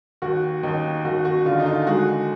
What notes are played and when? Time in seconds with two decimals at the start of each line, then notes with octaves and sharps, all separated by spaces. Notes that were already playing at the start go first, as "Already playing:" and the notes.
0.22 D#2 F#4
0.63 D#2 D#4
1.05 D#2 F#4
1.25 F#4
1.46 D3 F4
1.60 D#4
1.66 F4
1.87 G#3 F#4